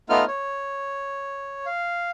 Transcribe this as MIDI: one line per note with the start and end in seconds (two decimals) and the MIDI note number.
0.10 0.24 57
0.10 0.24 59
0.10 0.24 63
0.10 0.24 65
0.10 0.24 89
0.28 1.66 73
1.66 2.11 77